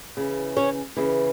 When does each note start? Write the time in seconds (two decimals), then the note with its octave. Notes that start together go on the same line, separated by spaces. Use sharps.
0.17 C#3 E3
0.56 C#4 C#5
0.97 C#3 E3